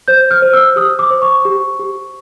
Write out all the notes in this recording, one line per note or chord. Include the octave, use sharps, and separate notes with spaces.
C5 G6
F6
C5
E6
G4 D#6
D6
C5
C#6
G4
G4